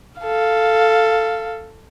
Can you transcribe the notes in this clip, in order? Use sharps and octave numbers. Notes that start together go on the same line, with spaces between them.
A4 F5